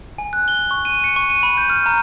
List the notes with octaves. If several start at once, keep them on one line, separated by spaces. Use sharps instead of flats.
G#5
F#6
G7
C#6
D#7
C#7
C#6
D#7
B5
G6
F6
A#5